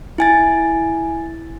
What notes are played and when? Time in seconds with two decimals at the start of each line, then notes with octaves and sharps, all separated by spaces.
0.18 E4 G#5 A6